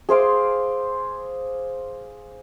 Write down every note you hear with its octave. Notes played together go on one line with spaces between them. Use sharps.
G#4 C5 F5 D6